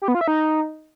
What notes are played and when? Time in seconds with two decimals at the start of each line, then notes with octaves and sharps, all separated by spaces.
0.02 G4
0.08 B3
0.15 F4
0.21 E5
0.28 D#4